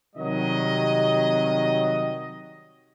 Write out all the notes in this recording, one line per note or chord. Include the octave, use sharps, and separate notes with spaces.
C3 D#3 F#3 G3 D#5